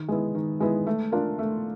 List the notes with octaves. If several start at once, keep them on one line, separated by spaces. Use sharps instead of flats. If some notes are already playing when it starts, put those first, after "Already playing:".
Already playing: D#3
G#3 B3 E4
D#3
G#3 B3 E4
A3
D4 F4 A#4
A3